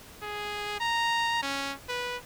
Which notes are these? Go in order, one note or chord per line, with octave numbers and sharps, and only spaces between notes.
G#4
A#5
C#4
B4